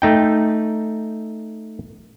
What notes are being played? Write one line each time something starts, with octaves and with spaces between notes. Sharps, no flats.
A3 D#4 G5